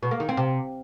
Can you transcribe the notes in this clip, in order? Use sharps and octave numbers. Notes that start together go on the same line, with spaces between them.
B2
A#3
D#3
C4
C3